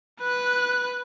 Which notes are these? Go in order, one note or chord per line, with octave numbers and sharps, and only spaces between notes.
B4 F#6